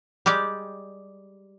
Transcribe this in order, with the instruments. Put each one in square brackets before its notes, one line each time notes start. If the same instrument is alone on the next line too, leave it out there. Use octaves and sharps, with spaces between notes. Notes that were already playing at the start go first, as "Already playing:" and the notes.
[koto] G3 G#3 G4 D5